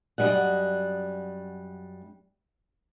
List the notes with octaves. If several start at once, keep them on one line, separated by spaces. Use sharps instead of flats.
F#2 F#3 G3 D#5 F#5